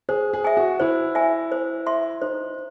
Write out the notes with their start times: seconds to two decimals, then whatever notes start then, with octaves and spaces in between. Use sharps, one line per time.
0.09 G#4 C5
0.33 G#4
0.44 E5 G#5
0.57 F#4
0.80 E4 C5
1.15 E5 G#5
1.52 C5
1.86 E5 C6
2.22 D#4 C5